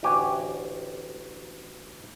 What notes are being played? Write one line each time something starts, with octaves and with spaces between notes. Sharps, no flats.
A1 D2 F#4 G4 G#5